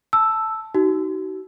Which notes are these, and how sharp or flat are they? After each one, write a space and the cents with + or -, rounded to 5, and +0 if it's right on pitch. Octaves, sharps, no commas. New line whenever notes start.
A5 +0 E6 +0
D#4 +10 F#4 +35